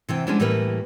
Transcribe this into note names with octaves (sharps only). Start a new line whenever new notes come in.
C3 E3 G5
F3 G#3 B3 C#4 D4 E4
A2 E3 G3 A#3 A#4 B4